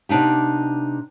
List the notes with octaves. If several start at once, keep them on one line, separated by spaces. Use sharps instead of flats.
C3 B3 D4 D#4 G4